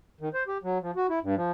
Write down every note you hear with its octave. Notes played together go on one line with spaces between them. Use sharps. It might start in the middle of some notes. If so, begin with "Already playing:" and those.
D#3
C5
G4
F#3
F3
F#4
E4
G2
F3